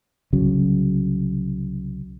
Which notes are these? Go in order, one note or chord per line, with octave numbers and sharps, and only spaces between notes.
C2 C#3 F#3